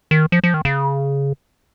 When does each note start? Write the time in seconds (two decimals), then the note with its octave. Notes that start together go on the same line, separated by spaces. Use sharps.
0.11 D#3
0.32 F3
0.44 F3
0.54 D#3
0.65 C#3